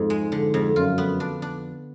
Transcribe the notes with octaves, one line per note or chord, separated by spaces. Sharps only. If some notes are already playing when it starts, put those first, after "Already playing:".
Already playing: F2 G#2
G#3
D3
F2
F#2 F4
B3
D4
D4